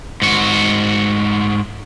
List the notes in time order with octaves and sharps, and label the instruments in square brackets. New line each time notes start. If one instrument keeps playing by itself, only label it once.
[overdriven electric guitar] G#2 F#4